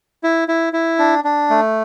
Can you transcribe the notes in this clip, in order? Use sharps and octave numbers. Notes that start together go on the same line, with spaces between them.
E4
E4
E4
D4
D4
A3